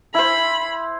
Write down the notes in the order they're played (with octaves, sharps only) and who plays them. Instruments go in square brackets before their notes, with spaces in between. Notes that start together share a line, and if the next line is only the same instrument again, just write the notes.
[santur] E4 C5 [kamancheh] B5